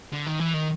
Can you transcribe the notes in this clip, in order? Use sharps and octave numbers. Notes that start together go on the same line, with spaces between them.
D3
D#3
E3
D#3